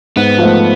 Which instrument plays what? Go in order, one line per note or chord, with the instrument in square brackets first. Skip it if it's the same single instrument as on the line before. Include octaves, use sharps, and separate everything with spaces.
[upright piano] G#2 [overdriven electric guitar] B3
[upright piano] F3 A3